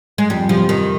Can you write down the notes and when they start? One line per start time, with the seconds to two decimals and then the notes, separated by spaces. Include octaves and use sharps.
0.18 G#3
0.30 F2 G3
0.49 C3 F3 G3
0.69 F2 D#3